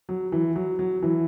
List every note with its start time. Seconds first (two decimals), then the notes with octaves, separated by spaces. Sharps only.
0.09 F#3
0.32 E3
0.56 F#3
0.79 F#3
1.03 E3